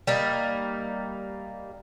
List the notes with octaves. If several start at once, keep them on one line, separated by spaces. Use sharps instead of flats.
G3 A#3 D#4